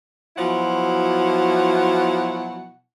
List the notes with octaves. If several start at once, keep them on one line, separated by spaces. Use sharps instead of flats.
B2 F3 F#3 E4 F#5